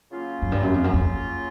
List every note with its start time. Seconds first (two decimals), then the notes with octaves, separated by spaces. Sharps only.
0.11 C#3 F#3 A#3 C#4 F4
0.42 F#2
0.52 G2
0.63 F#2
0.74 F2
0.84 F#2
0.94 F2